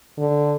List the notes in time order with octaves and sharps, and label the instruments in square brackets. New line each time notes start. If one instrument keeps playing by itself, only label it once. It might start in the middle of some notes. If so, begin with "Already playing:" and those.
[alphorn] D3